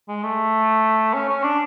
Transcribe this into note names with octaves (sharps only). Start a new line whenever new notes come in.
G#3
A3
C#4
C#4
D4